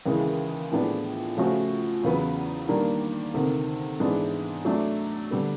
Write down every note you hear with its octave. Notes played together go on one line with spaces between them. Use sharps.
D#2 C#3 E3 G#3
A2 F3 G#3 B3 D4
C#3 F3 A3 C#4 F#4
E2 C#3 F#3 B3
D#3 G3 A#3 D4
D2 C3 D#3
G#2 E3 G#3 B3 D4
F#3 A3 D4
D3 G3 B3